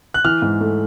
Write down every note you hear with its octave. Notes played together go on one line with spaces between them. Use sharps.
F#6
E3 F6
G#2
A3